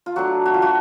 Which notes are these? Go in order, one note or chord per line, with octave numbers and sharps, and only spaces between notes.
F4
F#3 A3 D4 F#4
F#4
F4
F#4